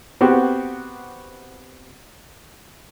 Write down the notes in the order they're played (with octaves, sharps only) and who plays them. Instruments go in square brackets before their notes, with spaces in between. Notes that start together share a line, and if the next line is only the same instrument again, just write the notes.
[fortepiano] B3 C4 F#4 G4